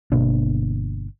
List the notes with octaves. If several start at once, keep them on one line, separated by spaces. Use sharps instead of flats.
G1 B2 A#3 D4